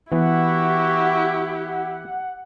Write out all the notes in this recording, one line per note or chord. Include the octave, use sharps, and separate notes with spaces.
E3 B3 E4 F#4 G4 F#5